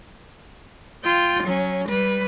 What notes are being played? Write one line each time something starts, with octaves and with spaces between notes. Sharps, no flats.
F4 G5
F#3 C#4
G3 B4